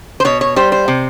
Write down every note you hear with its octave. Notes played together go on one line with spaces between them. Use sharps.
C5
B2 C#5
C#5
G3 C5
C5
C3